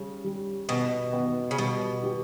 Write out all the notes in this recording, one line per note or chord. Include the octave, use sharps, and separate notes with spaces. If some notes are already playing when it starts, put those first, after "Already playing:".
Already playing: C#3 G3
G3
B2 B3
B3
C#3
B2 G3
G4